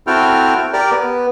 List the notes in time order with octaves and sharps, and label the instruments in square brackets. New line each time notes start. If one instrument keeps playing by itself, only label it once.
[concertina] C4 E4 F#4 A4 G5 F6
G4 A#4 D5
B3